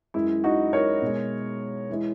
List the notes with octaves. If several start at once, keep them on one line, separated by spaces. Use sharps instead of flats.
F#2 E3 G#3 E4
D#4 F#4
A#4 C#5
B2 G#3
E3 G#3